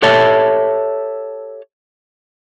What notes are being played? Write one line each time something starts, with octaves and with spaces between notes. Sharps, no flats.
G4 A4 C#5 E5 A5